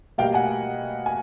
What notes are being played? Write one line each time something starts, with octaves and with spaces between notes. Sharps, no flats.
B2 G3 A#3 F5 G5
F#5 G#5
G#5